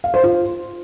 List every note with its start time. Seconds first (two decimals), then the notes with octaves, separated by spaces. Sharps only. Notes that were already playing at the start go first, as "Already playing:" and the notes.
0.04 F5
0.14 C5
0.24 F4